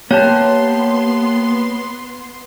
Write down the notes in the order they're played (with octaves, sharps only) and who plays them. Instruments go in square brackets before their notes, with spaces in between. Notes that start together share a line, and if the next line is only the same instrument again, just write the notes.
[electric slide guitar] A#3 G4 A5 [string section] B3 C6 [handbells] C#5